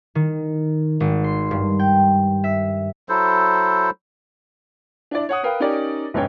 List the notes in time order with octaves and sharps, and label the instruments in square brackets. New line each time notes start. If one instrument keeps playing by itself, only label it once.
[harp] D#3
G#1
C6
G2
G5
E5
[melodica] F#3 E4 A4 C5
[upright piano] D4 E4 D5
C#5 F#5 D#6
A#4 B4 F5 G5
C#4 D#4 G4 A#4 D5
F1 G#2 C#4 C#5 G5